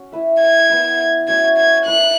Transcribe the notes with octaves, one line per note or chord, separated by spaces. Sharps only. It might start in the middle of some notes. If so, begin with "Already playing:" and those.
Already playing: C#4 F#4
E4 B4 E5
G#6
B3 E4 B4 E5
C#4 F#4 C#5 E5 G#6
G#6
E4 B4 D#5 F#6